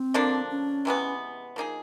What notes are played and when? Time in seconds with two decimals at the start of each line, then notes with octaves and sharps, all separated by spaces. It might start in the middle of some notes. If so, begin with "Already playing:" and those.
Already playing: C4
0.14 D3 F3 A#3 D4
0.50 C#4
0.85 C3 E3 G#3 B3
1.56 F3 A#3 D#4 G#4